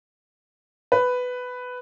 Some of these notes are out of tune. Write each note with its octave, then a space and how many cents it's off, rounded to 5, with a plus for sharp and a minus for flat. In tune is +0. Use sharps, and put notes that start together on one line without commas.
B4 +10